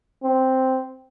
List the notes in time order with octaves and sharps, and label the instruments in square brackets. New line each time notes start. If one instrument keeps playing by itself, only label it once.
[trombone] C4